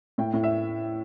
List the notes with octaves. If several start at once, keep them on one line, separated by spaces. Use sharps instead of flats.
A2 G5
A2
E5